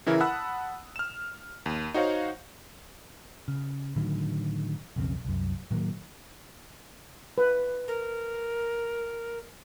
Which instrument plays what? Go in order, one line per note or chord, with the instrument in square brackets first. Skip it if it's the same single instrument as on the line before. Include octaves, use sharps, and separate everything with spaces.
[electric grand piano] C#3 E3 E4 A#4
F#5 A5 B5 D#6 E6 F#6
F6 E7
D#2
D#4 F#4 C5 C#5 F5 F#5
[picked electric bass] C#3
A2 D3 D#3 F#3
B1 F2 C#3 C4
C2 F#2
A2 D#3 F#3 A#3
[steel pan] B4
[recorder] A#4